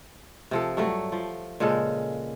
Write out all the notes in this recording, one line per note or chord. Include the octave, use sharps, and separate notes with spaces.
C3 F3 A4
G2 F#3 A3
F3
A#2 C#3 G#3 A4